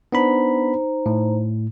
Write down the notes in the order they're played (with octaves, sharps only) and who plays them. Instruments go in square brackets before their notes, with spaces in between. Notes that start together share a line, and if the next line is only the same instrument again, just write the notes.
[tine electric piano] B3 D4 B5 [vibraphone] D#4 C5 A#5
[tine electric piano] A2